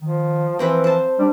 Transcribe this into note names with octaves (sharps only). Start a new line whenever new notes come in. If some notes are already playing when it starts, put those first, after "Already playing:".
D#3 F3
E3 F3 C4 A#4 B4
C5 A5
G3 D4